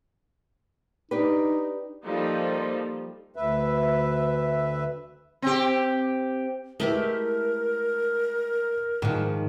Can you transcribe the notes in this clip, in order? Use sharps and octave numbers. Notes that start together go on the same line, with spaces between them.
D4 D#4 G4 B4
F3 G3 A#3 D#4 F4 A4
D2 B4 E5
C4 G4
G#3 A3 E4 G4 A#4 B4
G#2 D#3 F3